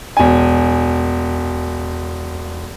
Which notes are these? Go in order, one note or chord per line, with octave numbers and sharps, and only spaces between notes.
E1 G#5